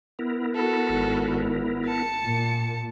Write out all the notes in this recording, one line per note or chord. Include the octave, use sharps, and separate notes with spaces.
B3 E4 A#4
F#4 A4
G#1
A5 C#7
A#2